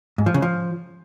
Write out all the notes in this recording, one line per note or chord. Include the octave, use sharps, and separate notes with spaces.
G#2
F3
C#3
F3